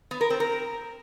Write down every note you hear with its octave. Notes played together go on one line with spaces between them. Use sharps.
B3
A#4
C4
A#4